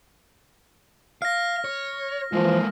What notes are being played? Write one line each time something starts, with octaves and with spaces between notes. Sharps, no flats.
F5 F6 A#6
C#5
E3 F3 G#3 A#3